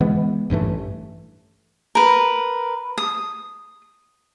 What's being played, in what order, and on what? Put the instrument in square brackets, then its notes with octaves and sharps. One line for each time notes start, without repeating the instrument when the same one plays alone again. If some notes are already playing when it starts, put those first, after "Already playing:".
[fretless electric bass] E3 G#3 B3
A1 G2 E3 A3
[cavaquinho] A#4 B4
D#6